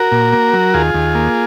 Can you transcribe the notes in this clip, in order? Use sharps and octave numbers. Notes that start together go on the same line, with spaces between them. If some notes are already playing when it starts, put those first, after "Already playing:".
Already playing: F#4 A#4
A#2
A#3
F#3
D#2 F4 G#4
D#2
A#3